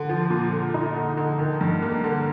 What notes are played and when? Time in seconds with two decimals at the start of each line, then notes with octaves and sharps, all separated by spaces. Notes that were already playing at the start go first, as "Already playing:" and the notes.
Already playing: D3
0.09 F3
0.30 A#2
0.53 D3
0.74 D#4
0.95 D3
1.17 D3
1.39 D#3
1.61 G2
1.82 A#3
2.04 D3